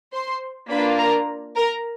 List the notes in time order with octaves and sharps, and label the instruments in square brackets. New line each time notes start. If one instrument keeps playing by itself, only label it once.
[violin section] C5 C6
A#3 D4 F4 B4 B5
A#4 A#5
A#4 A#5